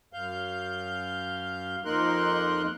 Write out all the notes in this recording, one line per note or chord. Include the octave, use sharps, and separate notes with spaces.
F#2 F5 G6
F2 A#3 D#4 A#4 C6 F#6